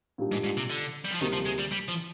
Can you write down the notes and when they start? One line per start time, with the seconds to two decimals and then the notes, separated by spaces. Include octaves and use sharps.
0.18 A#2 G3 D4 G4
0.32 G#2
0.44 G#2
0.57 C3
0.70 D3
1.05 G3
1.12 F3
1.21 D2 C3 D#3 G3 A#3
1.33 F3
1.46 G#3
1.59 G3
1.72 G3
1.88 F3